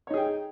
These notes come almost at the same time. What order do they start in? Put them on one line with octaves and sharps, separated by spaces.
C#5 D#4 G#4 G5